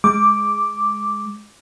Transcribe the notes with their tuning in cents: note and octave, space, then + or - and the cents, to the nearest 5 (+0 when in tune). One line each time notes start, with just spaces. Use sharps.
G#3 +0 D6 +0